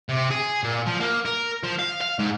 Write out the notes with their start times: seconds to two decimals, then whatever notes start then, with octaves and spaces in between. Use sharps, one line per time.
0.09 C3
0.30 G#4
0.64 A#2
0.87 F3
1.00 A#3
1.26 A#4
1.64 F3
1.79 F5
2.01 F5
2.19 G#2